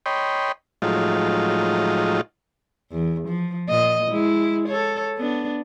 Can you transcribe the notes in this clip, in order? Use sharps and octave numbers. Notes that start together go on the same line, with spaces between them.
C#5 D#5 G5 B5 C6
A2 F3 F#3 G#3 D#4 F4
E2
F3
A#2 D#5
G#3 E4
A4 C#5
B3 D4